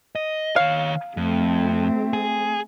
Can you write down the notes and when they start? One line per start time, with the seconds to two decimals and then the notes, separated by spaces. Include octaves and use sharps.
0.15 D#5
0.56 D#3 C#5 F5
1.17 F2 A3 C4
2.13 G#4